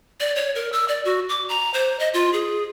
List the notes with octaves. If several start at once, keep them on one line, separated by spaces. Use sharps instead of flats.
D5
C#5
A#4
E6
D5
F#4
D6
A#5
C5
D#5
F4
G#4